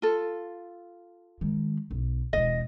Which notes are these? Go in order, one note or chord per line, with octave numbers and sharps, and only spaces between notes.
F4 A4
D#3 G#3
B1
E1 C4 D#5